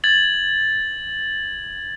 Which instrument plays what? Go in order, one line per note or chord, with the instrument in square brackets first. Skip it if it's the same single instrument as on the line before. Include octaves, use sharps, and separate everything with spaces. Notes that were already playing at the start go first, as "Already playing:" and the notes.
[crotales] G#6 A6 F#7